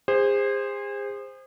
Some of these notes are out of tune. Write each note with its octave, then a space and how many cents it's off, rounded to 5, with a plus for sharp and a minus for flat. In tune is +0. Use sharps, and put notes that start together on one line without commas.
G#4 -35 C5 +0